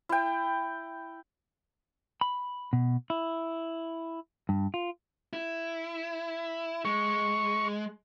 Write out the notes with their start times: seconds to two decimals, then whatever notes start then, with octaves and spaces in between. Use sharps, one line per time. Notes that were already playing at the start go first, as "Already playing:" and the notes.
0.09 E4 G5
2.21 B5
2.73 B2
3.10 E4
4.49 G2
4.74 F4
5.33 E4
6.85 G#3 C#6